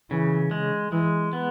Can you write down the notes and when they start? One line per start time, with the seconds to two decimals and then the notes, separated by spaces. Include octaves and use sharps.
0.10 C#3 E3
0.51 G#3
0.92 E3 G#3
1.33 B3